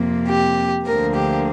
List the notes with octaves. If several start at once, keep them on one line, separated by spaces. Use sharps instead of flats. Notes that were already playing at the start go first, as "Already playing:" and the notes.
Already playing: F2 C3 A#3
G4
D2 D3 F3 A#3 A#4
G4